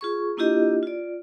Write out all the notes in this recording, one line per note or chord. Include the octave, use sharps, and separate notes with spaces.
F4 G#4 C#6
A#3 D4 E4 F4 G4 D#5
F4 D5